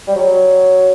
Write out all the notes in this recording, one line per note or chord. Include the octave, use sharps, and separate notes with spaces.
G3
F#3